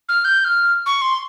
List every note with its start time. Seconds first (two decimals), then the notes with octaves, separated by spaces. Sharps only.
0.09 F6
0.25 G6
0.40 G6
0.45 F6
0.86 C#6
1.01 C6